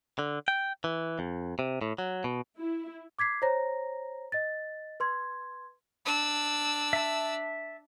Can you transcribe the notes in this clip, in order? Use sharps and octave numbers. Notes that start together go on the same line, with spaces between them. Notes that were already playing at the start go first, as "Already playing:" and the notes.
D3
G5
E3
F2
C3
A2
F#3
B2
E4
D6 G#6 B6 C7
C5 C#5 A#5 A#6
D#5 A6
B4 C6 G#6
D4 E6
E5 A5